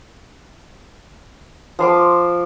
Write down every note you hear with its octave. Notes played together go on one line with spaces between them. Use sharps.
F3 C6 D6